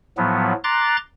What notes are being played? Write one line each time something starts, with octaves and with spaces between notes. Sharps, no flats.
A2 F3 F#3 B3
A#5 C6 D6 F#6 A6